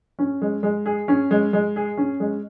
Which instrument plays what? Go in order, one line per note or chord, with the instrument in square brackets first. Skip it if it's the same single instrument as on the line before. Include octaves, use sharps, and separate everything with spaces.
[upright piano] C#4
G#3
G#3
G#4
C#4
G#3
G#3
G#4
C#4
G#3